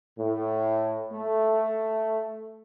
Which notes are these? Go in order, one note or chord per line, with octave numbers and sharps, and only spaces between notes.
A2
A3